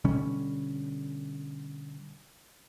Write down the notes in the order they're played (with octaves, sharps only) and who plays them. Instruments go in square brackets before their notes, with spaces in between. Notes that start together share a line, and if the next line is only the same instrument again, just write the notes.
[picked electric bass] B2 D3 G3 C#4